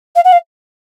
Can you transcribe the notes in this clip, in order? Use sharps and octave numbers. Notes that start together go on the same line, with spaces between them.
F5
F#5
F5